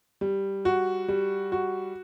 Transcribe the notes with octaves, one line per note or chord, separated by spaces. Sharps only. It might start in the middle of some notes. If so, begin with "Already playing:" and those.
G3
F#4
G3
F#4